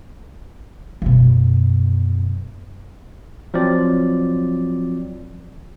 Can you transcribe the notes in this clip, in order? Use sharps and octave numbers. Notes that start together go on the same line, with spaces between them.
F#2 B2
F3 F#3 C4 D5